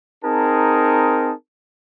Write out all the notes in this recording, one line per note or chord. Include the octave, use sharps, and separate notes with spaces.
C4 D#4 G#4 A#4 A5